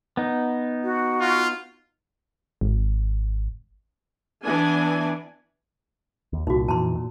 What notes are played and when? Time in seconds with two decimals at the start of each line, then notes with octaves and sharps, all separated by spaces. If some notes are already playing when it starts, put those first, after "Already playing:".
0.17 B3 D#4
0.83 F#4
1.20 F4
2.61 G#1
4.44 E3 B3 D4 G#5
6.33 D#2
6.47 C2 A#2 D#4 F#4
6.68 F2 A#2 E3 A5 A#5 C6
6.95 A#2